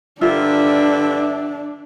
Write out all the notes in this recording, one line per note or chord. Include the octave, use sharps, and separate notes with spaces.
G2 D3 D4 F4 A#4 E5